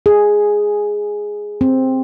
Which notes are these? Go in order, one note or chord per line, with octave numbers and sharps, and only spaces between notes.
G#4
C4